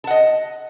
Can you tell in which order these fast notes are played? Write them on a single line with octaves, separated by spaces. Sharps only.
A5 F#5 D#5